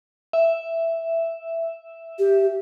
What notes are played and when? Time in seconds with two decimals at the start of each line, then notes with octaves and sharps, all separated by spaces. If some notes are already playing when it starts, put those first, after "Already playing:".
0.33 E5
2.19 G4